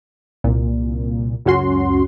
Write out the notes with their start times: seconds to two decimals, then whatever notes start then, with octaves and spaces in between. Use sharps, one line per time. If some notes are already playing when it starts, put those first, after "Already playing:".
0.44 C2 A#2
1.45 C#2 F#2 C#4 F#4 C6